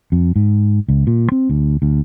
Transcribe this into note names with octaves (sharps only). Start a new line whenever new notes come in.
F2
G#2
C#2
A#2
C4
D2
D2